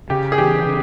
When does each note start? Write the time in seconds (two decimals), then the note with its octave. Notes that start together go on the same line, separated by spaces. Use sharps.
0.10 C#3 G4
0.32 G#4
0.38 E3 G4
0.66 C#3